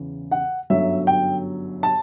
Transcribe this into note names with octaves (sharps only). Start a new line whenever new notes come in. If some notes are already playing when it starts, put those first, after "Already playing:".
Already playing: E2 C#3
F#5
G1 F#2 D3 F#3 E5
G5
A5